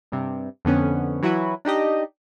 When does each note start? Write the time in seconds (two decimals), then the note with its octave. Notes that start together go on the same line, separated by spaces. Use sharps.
0.12 G2 C3
0.65 F2 D3 B3 C#4
1.22 E3 F#3 E4 F#4 B4
1.65 D4 D#4 G4 D#5